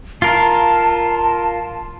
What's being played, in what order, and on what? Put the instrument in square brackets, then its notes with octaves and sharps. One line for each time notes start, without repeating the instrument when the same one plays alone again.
[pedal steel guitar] F4 A#4 [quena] A5